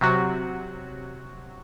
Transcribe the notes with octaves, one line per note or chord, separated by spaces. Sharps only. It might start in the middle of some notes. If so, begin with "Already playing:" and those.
C3 F#3 F#4